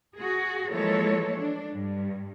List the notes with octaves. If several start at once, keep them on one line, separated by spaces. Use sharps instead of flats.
F#4 G#4
E3 F3 G#3 A#3 A4 C#5
D4
G2